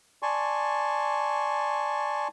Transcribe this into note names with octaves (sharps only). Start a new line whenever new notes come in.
D5 G#5 A5 C6 C#6